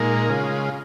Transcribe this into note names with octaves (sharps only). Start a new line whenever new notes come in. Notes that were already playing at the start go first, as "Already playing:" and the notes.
Already playing: A#2 G#3 D#4 A#4
C#3 G#3 F4